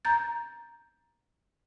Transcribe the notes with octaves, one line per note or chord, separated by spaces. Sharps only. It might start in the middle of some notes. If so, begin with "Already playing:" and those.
A#5 G6 A6